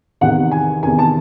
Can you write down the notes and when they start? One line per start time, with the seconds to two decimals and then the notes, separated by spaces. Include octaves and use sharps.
0.21 E2 C3 D#3 F#5
0.51 G#5
0.83 E2 C3 D#3 G#5
0.99 A5